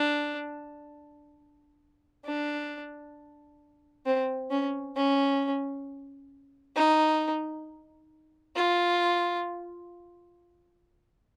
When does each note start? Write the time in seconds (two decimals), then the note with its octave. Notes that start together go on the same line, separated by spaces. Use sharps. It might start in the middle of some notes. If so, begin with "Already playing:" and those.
Already playing: D4
2.25 D4
4.05 C4
4.51 C#4
4.96 C#4
6.76 D#4
8.56 F4